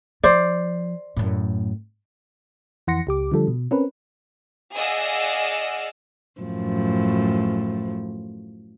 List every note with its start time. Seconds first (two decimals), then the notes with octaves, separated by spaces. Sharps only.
0.23 F3 C5 D5
1.17 F#2 A2
2.87 F2 E3 F#5 C6 A#6 C#7
3.07 C#2 G4 D6
3.32 D3 F3 G3 A4
3.47 B2
3.71 C4 C#4 A#4 B4
4.75 G#4 D5 D#5 F5 F#5 E6
6.41 F#2 A2 F3